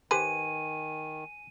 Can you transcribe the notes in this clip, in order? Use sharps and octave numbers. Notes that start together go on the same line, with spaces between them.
D#3 G4 B4 C5 G#5 D#7